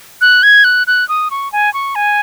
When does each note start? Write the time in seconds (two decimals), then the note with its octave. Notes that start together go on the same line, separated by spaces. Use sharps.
0.21 F#6
0.43 G#6
0.64 F#6
0.87 F#6
1.09 D#6
1.31 C#6
1.52 G#5
1.74 C#6
1.95 G#5